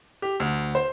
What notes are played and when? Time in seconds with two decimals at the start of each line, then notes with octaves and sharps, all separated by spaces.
0.22 G4
0.40 D2
0.75 C5